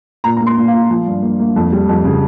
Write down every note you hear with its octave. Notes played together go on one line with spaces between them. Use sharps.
A#2 A#5
A#5
A#3
C6
A#2
F5
A#2
F3
G2
A#3
A#3
F2
G3
F2
C#3